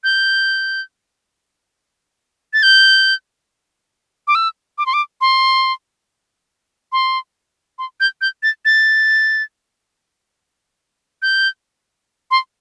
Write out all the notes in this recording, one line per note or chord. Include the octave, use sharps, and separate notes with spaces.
G6
A6
G6
D6
E6
D6
C6
D6
C6
C6
C6
G6
G6
A6
A6
G6
C6